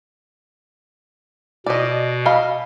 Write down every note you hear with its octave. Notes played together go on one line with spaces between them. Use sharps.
B2 D5 D#5
D#5 F5 B5